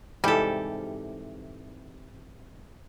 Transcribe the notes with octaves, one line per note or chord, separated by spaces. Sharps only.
G#2 C3 E3 G3 G4 A4